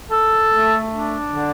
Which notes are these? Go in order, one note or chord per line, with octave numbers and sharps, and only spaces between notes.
A4
A3
D4
D3